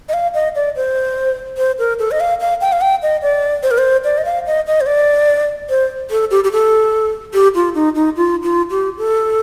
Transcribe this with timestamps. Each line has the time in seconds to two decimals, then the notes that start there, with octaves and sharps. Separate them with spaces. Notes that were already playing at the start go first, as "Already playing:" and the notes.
0.09 D#5
0.13 F5
0.34 D#5
0.55 D5
0.76 C5
1.57 C5
1.79 A#4
1.99 A4
2.11 D#5
2.20 F5
2.40 F5
2.61 G5
2.72 F5
2.81 G5
3.02 D#5
3.22 D5
3.63 C5
3.71 A#4
3.78 C5
4.04 D5
4.18 D#5
4.25 F5
4.46 D#5
4.67 D#5
4.81 C5
4.86 D5
5.69 C5
6.10 A4
6.31 G4
6.44 G4
6.52 A4
7.34 G4
7.55 F4
7.75 D#4
7.95 D#4
8.16 F4
8.43 F4
8.70 G4
8.98 A4